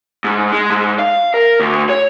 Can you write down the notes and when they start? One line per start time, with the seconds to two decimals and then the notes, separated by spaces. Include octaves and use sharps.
0.24 G#2
0.52 G#3
0.70 G#2
0.99 F5
1.34 A#4
1.60 D2
1.89 C#5